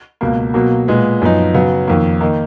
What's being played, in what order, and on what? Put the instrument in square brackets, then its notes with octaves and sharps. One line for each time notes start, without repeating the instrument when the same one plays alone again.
[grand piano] C#2 B2 A#3
B2 F#3 A#3
A#2 G#3 B3
F#2 F3 B3 D#4
C#3 F#3 B3
F2 D#3 A#3
D#3 A#3 D#4